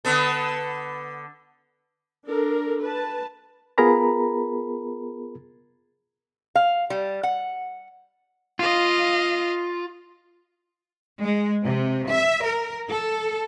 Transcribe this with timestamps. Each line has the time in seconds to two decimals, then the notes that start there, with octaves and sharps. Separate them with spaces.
0.05 D3 B3 A4
2.29 D4 A4 A#4
2.83 B4 A5
3.78 B3 F4 G#4 A#4 A#5 B5
6.55 F5
6.90 G3
7.23 F#5
8.59 F4 D#5 F5
11.23 G#3
11.65 C3
12.09 E5
12.46 A#4
12.89 A4